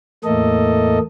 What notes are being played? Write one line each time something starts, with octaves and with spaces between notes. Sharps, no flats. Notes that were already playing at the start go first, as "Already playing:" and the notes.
E2 A2 A3 A#3 A4 D#5